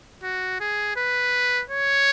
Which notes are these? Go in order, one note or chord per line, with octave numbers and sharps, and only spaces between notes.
F#4
G#4
B4
C#5